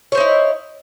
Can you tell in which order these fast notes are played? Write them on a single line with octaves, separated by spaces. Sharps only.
C#5 C5 D#4 E4